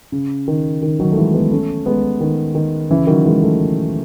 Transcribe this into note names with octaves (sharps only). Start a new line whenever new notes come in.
C#3
D#3
D#3
D#3 F#3
A3
E3 G#3
G#3 B3
A3 C#4
G#3 B3
D#3
D#3
C#3 E3
D#3 F#3
E3 G#3
F#3 A3